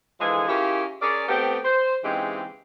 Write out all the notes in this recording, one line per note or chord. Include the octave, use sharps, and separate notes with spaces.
D3 E3 F3 G#3 G#4
C#4 E4 F4 G4 G#4 A#4
C#4 G#4 A#4 D5
A3 B3 C4 G4
C5
C#3 E3 G#3 C4 D#4 G4